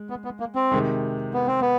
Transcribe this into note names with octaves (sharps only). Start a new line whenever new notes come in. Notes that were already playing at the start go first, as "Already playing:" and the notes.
Already playing: G#3
B3
B3
A#3
C4
C3 D#3 G#3
B3
C4
B3